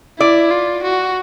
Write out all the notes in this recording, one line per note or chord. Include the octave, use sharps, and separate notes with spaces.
E4 D5
F4
F#4